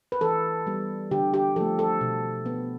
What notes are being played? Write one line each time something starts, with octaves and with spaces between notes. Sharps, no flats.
B4
E3 A4
G3 B3
D3 G4
G4
F3 A3 A4
A4
B2
B3